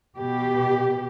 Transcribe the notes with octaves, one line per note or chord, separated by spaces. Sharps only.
B2 G4